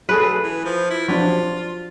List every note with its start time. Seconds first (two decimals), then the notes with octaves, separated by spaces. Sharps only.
0.09 F#3 A3 G#4 A4 B4
0.43 E3
0.65 F3
0.90 E4
1.08 F3 F#3 D4 F4